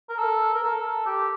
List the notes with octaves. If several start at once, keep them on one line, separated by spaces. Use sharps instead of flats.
A#4
A4
A#4
A4
G4